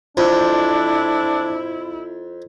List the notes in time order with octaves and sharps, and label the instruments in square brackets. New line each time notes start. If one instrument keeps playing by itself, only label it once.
[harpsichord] F2 [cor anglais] D4 [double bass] E4